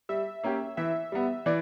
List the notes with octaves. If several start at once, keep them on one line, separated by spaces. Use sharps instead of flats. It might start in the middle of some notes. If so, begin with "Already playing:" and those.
G3 E5
A#3 C#4 G4
E3 E5
G3 B3
E3 D5